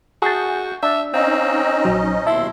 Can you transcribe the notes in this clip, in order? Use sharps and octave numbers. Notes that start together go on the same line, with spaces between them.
F#4 G#4 A5 C#6 G6
D4 E5
C4 C#4 D#4 C#5 D#5 F5
A#1 F#3 C5
D#2 B2 E4 E5 A5 C6